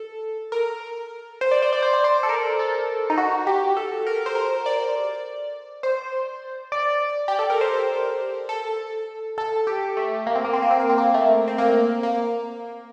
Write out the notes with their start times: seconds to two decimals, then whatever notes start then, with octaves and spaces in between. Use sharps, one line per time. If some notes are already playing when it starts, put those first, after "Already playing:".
Already playing: A4
0.52 A#4
1.41 C5
1.51 D5
1.62 C5
1.73 D5
1.82 C5
1.93 D5
2.04 C5
2.23 A4
2.29 A#4
2.59 A4
3.10 D#4
3.18 F#4
3.47 G4
3.77 A4
4.07 A#4
4.26 C5
4.35 A#4
4.66 D5
5.83 C5
6.72 D5
7.28 G4
7.39 A4
7.50 A#4
7.61 C5
8.49 A4
9.38 A4
9.67 G4
9.97 A3
10.27 A#3
10.35 C4
10.45 A#3
10.53 C4
10.62 A#3
10.71 C4
10.80 A#3
10.89 C4
10.98 A#3
11.14 A3
11.48 C4
11.58 A#3
12.03 A#3